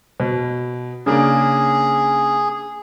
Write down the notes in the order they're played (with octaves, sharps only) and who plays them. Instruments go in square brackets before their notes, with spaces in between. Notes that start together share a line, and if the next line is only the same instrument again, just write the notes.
[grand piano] B2
[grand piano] C#3 A#3 D4 [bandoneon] G#4